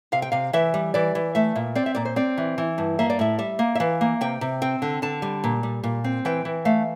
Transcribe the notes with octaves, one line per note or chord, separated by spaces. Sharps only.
C3 F5
G5
C3 F5
E3 E5
G3
E3 D5
E3
A3 E5
A#2
C4 D5
E5
A#2 D5
C5
C4 D5
E3
E3
G2
A#3 E5
D5
A2 E5
G3 E5
A#3
E5
E3 F5
A#3
C3 G5
C3
C4 G5
D3
D3 A5
G3
A#2
G3
A#2
C4
E3 G5
E3
A3 F5